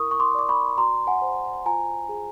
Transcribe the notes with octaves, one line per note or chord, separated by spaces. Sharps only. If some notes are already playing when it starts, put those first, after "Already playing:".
Already playing: E4 A#4 C#6 D#6
C#6
C6 D6
D5 D6
B5 C#6
F#4 A#5 C6
F#5 G#5
C5
F4 G#5 A#5
G#4